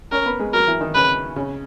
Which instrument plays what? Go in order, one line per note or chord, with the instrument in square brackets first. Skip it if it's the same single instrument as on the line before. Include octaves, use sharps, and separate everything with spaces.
[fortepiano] C#4 C#5 [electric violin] A#4
[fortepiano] B3 B4
G#3 G#4
[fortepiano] F#3 F#4 [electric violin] A#4
[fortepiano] E3 E4
D#3 D#4
[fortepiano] C#3 C#4 [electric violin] B4
[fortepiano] C#3 C#4